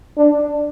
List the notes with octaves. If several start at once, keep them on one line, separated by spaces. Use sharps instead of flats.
D4